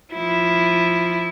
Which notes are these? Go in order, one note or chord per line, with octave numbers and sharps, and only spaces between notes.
F3 E4